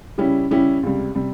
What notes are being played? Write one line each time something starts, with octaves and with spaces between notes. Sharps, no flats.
C#3 G3 C#4 E4 G4
C#3 G3 C#4 E4 G4
C#2 C3 G3
C3 G3